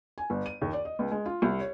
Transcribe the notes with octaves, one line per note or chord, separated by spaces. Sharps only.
G#5
G1
D#7
D#2
D5
D#5
C#2
G#3
F4
C2
C#5